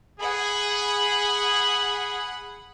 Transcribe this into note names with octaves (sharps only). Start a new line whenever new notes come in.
G#4 F#5 B5